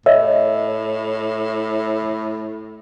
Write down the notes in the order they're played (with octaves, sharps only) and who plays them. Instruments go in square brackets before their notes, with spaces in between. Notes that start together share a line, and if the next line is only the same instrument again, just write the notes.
[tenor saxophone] A2 [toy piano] C#5 D#5 [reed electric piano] E5